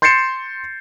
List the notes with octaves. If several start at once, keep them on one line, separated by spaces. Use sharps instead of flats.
C6 G6 A6 C7 C#7 E7